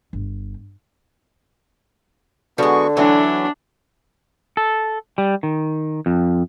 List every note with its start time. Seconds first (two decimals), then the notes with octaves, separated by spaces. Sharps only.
0.13 G1
2.58 D3 F3 G#3 B3 F#4 C#6
2.97 E3 F#3 A3 D4 E4
4.57 A4
5.18 G3
5.43 D#3
6.06 F2